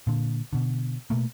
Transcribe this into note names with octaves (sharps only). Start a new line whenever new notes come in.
A#2 D3
B2 D3
B2 A3 A#3